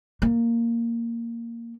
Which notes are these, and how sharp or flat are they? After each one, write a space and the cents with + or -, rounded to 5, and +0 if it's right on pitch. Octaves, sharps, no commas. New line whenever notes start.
A#3 -5